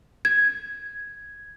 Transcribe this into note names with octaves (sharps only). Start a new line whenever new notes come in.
G#6